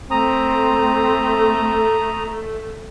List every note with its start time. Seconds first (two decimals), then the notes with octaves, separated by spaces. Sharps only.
0.11 A3 C4 A#5 D#6